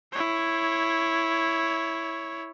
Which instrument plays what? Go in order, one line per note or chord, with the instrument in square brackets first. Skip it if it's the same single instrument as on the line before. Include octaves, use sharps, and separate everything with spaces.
[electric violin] E4 C#5